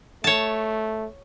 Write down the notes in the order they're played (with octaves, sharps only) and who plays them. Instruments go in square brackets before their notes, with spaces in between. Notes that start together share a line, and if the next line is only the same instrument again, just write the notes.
[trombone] A3 [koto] C#5 A5